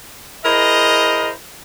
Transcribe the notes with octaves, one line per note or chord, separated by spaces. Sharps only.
E4 G#4 A#4 C5 D#5